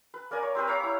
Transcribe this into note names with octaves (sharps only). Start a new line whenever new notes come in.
B4
A#3 A#4 D5 G#5
C#5
C4 G4 A#4 B4
C#5 F5 A#5 B5
E4